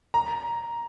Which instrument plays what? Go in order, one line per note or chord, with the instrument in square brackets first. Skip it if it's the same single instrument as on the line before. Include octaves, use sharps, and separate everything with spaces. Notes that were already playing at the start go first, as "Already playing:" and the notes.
[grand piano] A#5